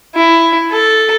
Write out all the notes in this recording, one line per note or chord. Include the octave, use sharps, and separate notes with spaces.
E4
A4